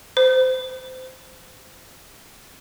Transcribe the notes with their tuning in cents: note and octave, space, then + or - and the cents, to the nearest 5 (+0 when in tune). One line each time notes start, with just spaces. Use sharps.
C5 -25